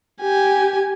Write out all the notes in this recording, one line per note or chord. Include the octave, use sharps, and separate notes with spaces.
G4 G#5